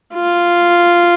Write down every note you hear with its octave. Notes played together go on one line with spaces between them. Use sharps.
F4